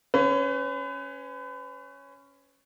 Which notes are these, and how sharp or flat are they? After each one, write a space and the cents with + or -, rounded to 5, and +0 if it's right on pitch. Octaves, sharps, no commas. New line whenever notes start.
C#4 +0 B4 +35